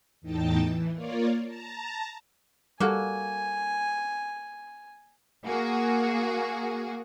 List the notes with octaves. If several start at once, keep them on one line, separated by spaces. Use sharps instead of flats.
E2 A2 D#4 G5 A5 A6
E3
A#3 F4 A#4 C#5 D5
A5 A#5
G3 A#3 F#4 A4 G#5
A#3 F#4 G#4